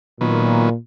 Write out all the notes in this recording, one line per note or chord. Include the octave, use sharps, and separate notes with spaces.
A#2 D#3 F#3 B3